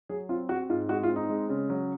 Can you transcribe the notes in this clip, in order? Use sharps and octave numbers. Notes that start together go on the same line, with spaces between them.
F#3 G#4
C4 F4
C4 F#4
G#2 F4
G#3 F#4
F4
C4
D#4
G#3
C#3
F#3